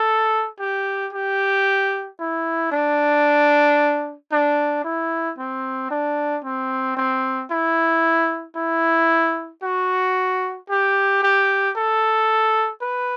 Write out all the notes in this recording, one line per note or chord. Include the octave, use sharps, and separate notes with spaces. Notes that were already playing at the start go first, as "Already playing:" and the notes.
Already playing: A4
G4
G4
E4
D4
D4
E4
C4
D4
C4
C4
E4
E4
F#4
G4
G4
A4
B4